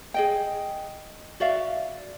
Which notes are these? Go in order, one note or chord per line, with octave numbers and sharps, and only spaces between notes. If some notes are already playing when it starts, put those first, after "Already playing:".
G#4 D#5 G5
F#4 D5 E5 F5